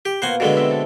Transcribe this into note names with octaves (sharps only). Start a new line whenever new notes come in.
G4
B2 A#3 F4 C5 F#5 G#5
B2 D3 F#3 G#3 B3 E4
C4 E5
A4